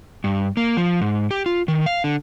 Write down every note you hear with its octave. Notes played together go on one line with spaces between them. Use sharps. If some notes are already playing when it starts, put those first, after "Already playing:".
G2
A#3
F3
G#2
G4
F4
D#3
F5
D3